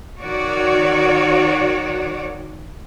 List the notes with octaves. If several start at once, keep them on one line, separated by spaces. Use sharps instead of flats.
D#3 F#4 C#5 D5